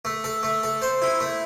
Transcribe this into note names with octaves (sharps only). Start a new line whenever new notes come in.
A3
A4
A3
A4
C5
E4
A3